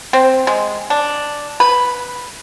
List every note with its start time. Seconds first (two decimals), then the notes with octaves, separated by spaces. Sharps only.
0.13 C4
0.47 G#3
0.90 D4
1.60 B4